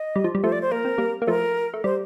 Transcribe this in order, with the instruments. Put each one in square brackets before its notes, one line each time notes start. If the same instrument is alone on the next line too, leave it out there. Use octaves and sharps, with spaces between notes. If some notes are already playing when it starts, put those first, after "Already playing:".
Already playing: [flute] D#5
[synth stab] G3
F3
G3
[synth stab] F3 A3 [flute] C5
[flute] D5
C5
[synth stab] A#3 [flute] A#4
[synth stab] C4
G3 A#3
A#3
[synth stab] F3 A3 [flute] A#4
[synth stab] A3
[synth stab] G3 [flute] C5